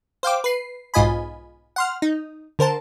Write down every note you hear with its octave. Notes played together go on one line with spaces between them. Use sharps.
C5 F5 G5 D6
B4 C7
B1 G#2 F4 D#5 G#5 B5
F#5 C6 F6
D#4
D3 A#4 C5 A5